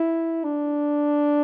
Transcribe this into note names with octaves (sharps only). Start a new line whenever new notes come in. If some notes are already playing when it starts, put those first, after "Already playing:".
Already playing: E4
D4